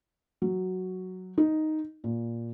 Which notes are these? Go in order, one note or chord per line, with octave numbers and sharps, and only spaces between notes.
F#3
D#4
A#2